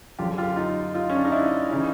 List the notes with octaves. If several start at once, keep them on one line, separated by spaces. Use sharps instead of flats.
F#1 F#2 D3 F4 G4
F4 G4
D#4 F4
D#4 F4
C#4
D4
D#4
D4 E4
C#3 E3 C#4 D#4